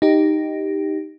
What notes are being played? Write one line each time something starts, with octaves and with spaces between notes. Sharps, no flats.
D#4 G4